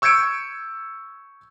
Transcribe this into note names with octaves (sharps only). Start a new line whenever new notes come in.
C#6 E6 G6 G#6 C#7 D7